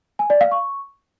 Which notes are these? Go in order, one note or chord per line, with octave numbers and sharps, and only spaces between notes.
G#5
D5
F5
C#6